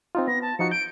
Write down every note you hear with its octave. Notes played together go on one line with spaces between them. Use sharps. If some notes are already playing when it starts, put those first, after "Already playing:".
C4 D#4 F4
B3 A#6
A5
F3 D#4 F#4 C#7
G6 D7